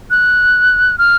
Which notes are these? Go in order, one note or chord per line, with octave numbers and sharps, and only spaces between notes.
F#6
F6